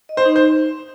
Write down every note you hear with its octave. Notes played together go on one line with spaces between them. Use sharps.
D#5
C5
D#4
C5